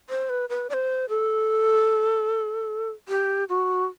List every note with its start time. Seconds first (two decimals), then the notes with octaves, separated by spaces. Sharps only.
0.10 C5
0.30 B4
0.49 B4
0.70 D5
0.74 C5
1.09 A4
3.09 G4
3.49 F#4